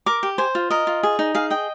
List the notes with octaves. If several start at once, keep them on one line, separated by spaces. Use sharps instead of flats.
A#4 D6
G4
C5 G#5
F4
A#4 D#5
F4
G#4
D#4
G#4 F5
D#5 G5